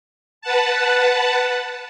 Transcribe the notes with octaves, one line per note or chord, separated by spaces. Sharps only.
B4 F#5 A5